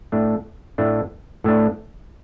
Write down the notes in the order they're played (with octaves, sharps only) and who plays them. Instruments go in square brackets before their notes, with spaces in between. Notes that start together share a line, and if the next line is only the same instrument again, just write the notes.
[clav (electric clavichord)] A2 A3 D4
A2 A3 D4
A2 A3 D4